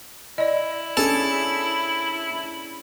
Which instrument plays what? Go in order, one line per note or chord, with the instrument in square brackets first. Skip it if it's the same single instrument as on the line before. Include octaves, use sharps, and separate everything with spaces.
[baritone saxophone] E4 [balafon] D5 D#5
[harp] C#4 D4 G#4 [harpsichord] A4